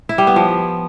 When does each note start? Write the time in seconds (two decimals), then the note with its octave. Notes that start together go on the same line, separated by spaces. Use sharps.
0.09 E4
0.18 G3
0.27 B3
0.36 F3